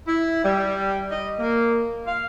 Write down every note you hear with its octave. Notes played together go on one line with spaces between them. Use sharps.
E4
G3
D#5
A#3
F5